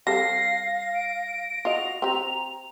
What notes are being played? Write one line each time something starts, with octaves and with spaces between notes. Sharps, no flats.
G3 C4 A4 F5 A#6 C7
D7
F4 F#4 D#5 F7
C4 G4 A#5